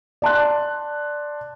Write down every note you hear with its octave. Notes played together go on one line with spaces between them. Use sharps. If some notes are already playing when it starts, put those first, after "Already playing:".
D5 A5 C6 F#6